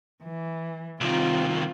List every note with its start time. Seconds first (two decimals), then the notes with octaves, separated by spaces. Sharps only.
0.23 E3
1.01 C2 D#3 C4 F4